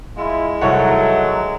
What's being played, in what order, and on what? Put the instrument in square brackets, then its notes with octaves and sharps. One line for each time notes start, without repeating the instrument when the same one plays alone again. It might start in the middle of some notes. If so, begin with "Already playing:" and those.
[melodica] G#3 [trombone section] E4 F4
[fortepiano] C2 C#5 F#5 [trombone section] D#3 F#3 [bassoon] A3